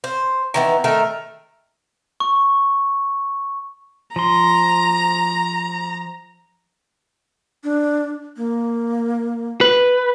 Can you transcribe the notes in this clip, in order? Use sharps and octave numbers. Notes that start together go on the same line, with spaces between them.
C5
D#3 E3 B3
D#3 A3 A4 A#4
C#6
F3 A#5 C6
D4
A#3
B4